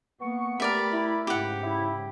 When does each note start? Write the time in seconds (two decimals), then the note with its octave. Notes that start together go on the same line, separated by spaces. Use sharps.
0.21 A#3 B3 C#6
0.60 A3 G4 A#4 D5 E5 B5
0.93 E4
1.27 G#2 C#3 G4 F#5
1.63 E4